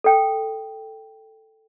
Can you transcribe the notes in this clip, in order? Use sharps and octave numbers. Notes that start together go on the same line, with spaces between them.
A4 G5